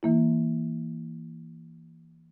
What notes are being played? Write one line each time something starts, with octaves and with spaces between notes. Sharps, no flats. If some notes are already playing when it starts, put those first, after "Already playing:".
E3 A#3 E4